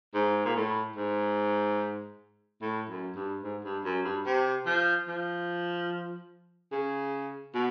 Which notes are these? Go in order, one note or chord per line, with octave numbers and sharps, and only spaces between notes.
G#2
A#2
A2
G#2
A2
F#2
G2
G#2
G2
F#2
G2
C3
F3
F3
C#3
B2